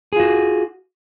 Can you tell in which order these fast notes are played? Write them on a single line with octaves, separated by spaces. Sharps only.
G#4 F4 F#4